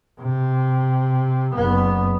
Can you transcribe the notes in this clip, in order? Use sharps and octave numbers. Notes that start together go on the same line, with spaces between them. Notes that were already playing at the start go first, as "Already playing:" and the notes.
C3
F#1 B3